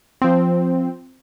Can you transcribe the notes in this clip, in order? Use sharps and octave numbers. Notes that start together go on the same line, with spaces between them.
F3 C4